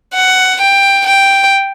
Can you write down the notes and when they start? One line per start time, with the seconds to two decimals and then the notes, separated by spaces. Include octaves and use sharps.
0.14 F#5
0.61 G5
1.07 G5